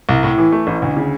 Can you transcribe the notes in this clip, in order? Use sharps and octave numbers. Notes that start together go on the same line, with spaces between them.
C2
A2
E3
A3
A1
D2
C#3